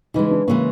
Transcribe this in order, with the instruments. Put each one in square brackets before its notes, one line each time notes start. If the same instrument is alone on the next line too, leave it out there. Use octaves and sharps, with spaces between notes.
[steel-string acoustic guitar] C#3 E3 G#3 [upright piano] D#4
[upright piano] D4
[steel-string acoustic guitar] C#3 E3 G#3 [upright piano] A#3